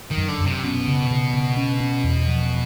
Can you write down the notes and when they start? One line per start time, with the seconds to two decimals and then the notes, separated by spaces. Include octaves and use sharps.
0.11 D#3
0.17 F#2
0.28 D3
0.41 F#2
0.46 C3
0.64 B2 C#4
0.88 C#3
1.11 C#3
1.34 C#3
1.57 C#4
1.80 C#4
2.04 E2
2.28 F3